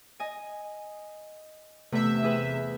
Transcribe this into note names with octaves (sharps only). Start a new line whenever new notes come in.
D#5 G#5
E2 C3 A3 B4 E5
E4 G#4 B4